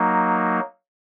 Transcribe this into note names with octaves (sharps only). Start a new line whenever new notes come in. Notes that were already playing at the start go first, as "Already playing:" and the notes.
Already playing: F#3 A#3 D#4